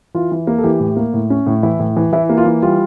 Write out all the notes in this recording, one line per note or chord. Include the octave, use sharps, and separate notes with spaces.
E3 F4
E3
A#3
A4
E3 G4
A2
A#3
A2
C#4
A2
E3 E4
A2
E3
E3 E4
A#3
F4
E3
G3 F4